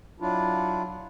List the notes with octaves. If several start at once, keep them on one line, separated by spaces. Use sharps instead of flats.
F#3 D4 E4 F4